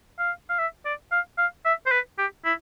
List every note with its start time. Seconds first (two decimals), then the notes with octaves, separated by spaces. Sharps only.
0.19 F5
0.49 F5
0.59 E5
0.85 D5
1.12 F5
1.38 F5
1.65 E5
1.86 C5
1.91 B4
2.18 G4
2.45 E4